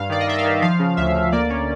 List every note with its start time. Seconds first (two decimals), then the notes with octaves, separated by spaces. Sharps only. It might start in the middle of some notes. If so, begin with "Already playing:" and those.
Already playing: G2 F5
0.09 D#3 D5
0.20 D#5
0.28 D#3 E5
0.39 F5
0.45 D#3
0.62 F3 F5
0.79 C#3
0.97 D2 E5
1.15 D2
1.32 A#3 D5
1.50 C#4